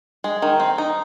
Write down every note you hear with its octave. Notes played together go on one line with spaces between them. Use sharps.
G#3
D#3
C4
D#4